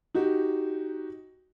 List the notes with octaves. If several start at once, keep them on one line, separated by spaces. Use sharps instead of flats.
D#4 F#4 G4